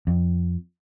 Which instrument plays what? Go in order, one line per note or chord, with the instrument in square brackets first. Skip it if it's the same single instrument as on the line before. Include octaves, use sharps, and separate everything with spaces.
[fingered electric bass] F2